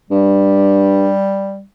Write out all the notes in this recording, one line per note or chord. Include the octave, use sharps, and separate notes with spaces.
G2 G3